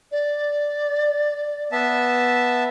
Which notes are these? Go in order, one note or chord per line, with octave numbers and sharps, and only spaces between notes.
D5
B3 E5 A5